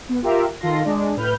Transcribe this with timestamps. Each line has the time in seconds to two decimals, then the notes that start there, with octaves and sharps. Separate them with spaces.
0.09 B3
0.22 F4 G4 A#4 E5
0.60 D#3 F4 A4 C6 A#6
0.84 G#3 D4
1.17 A2 B4 F6 G6